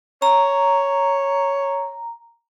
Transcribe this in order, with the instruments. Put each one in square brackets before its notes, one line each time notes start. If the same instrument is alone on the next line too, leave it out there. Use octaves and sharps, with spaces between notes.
[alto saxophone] C#5 [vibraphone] A#5